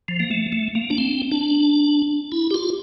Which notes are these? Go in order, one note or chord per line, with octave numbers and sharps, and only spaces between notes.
F3
A#3
A3
A3
A#3
D4
C4
D4
E4
G4
F4